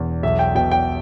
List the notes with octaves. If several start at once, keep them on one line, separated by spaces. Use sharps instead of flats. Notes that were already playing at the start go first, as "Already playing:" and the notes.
Already playing: E1 E2
B1 E5
G5
B2 G5
G5